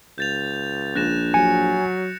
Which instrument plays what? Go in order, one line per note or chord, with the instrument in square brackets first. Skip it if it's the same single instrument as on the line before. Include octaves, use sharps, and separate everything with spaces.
[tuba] C#2 [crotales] G6 A6 F7
[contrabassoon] A#1 [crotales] F#6 A#6 E7
[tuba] F#3 [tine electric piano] G#5 [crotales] C#7